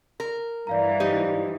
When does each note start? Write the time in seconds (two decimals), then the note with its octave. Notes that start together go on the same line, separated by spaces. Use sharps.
0.20 A#4
0.67 G2 E3 D5 F5 A#5
1.00 D#4 G4 C5